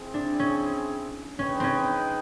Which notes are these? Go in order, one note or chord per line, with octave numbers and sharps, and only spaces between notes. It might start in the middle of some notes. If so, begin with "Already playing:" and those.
Already playing: C4 E4 G#4
D4
C#4
C#4 D#4 G#4 B4 D#5 G5
C4 C#4